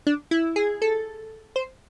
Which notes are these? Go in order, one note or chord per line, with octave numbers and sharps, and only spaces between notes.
D4
E4
G#4
A4
C5